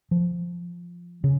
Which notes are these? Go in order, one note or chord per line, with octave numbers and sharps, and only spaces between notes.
F3
C#3